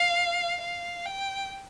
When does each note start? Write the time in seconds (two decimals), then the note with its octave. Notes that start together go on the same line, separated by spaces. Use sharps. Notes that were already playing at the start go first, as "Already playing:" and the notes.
Already playing: F5
0.61 F5
1.06 G5